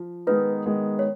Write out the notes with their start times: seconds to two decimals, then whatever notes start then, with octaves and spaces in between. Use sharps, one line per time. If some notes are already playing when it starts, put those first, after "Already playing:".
Already playing: F3
0.27 D#3 G#3 B3 D#4 B4
0.66 D#3 G#3 B3 D#4
0.99 C#5